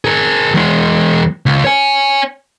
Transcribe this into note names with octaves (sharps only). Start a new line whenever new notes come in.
G#4 A#4
E2 G#3
C#2
C#5 G#5